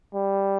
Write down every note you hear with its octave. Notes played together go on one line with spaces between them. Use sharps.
G3